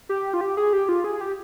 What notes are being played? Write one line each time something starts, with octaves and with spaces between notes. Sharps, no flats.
G4
F4
G4
G#4
G4
F4
G#4
G4